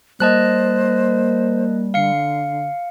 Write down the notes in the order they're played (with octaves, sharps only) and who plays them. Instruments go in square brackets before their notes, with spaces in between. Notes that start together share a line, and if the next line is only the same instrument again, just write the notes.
[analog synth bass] G3 [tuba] A#3 [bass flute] C5 [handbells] D#5 A5 F#6
[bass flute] D3 [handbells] F5 C#7